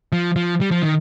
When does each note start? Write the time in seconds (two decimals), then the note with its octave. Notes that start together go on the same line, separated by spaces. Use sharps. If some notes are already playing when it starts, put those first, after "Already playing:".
0.12 F3
0.36 F3
0.61 G3
0.71 F3
0.82 D#3